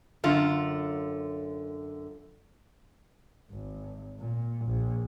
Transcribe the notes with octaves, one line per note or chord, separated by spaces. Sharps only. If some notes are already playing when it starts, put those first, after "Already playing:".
F#2 D3 F4
G#1
A#2
A#1